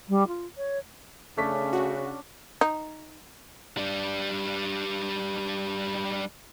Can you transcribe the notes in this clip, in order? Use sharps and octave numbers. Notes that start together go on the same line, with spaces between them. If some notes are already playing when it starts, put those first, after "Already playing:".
G3
F4
C#5
C#3 A3 C#4 D4 B6
F#4
D#4
G3 D4